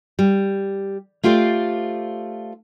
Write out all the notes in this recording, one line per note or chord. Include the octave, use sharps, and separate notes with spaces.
G3
A3 F4 G4 C5 D5